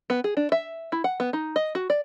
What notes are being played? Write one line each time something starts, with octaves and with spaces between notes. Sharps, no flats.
B3
G#4
D4
E5
E4
F#5
B3
D#4
D#5
F#4
D5